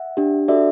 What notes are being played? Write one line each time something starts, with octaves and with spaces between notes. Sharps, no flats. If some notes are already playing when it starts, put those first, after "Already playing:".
Already playing: E5 F#5
D4 G4
D4 F#4 A4 D5 E5